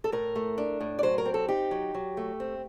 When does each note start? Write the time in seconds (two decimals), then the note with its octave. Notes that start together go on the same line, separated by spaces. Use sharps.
0.04 A4
0.12 A2 A#4
0.35 A3
0.58 D4
0.81 A2
0.99 D5
1.03 F#3 C5
1.18 A#4
1.26 C4
1.34 A4
1.48 D#4 G4
1.71 F#3
1.94 F#3
2.17 A3
2.40 C4